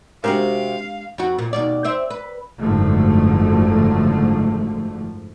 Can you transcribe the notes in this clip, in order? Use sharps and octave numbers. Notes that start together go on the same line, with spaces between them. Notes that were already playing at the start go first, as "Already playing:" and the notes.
C3 G#3 C4 D4 F#4 G4 A#4 F5
F2 F#4
A#2
D#2 B2 D5
C4 C5 E5
B4
F#1 G#2 D3 F3 A3